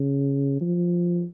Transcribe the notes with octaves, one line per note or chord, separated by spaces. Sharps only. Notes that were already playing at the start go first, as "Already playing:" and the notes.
Already playing: C#3
F3